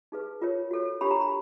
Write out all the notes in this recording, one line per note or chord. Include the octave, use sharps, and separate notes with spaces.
D#4 G#4 B4
F4 A#4 C#5
F#4 A4 C#5
D4 G4 A#4 C#5 B5
A#5
B5